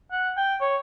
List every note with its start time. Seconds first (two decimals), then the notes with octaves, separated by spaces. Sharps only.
0.11 F#5
0.37 G5
0.61 C#5